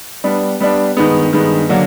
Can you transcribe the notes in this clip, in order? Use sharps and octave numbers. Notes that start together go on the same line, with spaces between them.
G3 B3 D4
G3 B3 D4
G2 D#3 G#3 B3
G2 D#3 G#3 B3
D3 F#3 A#3 D4